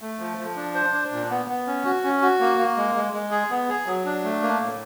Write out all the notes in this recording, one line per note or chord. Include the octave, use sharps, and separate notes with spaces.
A3
F3
F3
D4
C5
D4
A#2
B3
B3
C#4
F#4
C#4
F#4
A#3
A#3
G#3
G#3
G#3
G#4
B3
G#4
F#3
D4
A3
A#3
A2